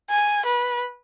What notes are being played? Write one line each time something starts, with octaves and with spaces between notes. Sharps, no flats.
G#5
B4